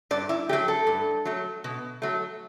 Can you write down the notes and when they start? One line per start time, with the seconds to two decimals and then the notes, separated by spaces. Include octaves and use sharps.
0.11 G2 D5
0.29 E4
0.49 A3 G4
0.53 F#3
0.68 A4
0.87 G2
1.25 F#3 A3
1.64 B2
2.02 F#3 A3